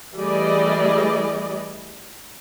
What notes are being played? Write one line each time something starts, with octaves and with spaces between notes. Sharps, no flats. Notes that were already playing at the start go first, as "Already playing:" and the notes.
E3 G3 A3 G#4 D5 D#5